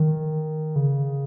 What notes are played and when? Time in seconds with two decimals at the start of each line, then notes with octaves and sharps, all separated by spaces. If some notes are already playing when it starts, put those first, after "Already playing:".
Already playing: D#3
0.76 C#3